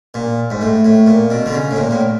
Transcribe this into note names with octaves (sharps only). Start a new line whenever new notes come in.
A#2
G#2
A2
A2
A#2
B2
D3
C#3
A2
A#2
A2